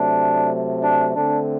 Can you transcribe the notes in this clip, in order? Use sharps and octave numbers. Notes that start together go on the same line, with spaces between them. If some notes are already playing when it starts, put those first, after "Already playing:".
Already playing: C3 F#3 A3 D4
D4
D3 A3 C4 D4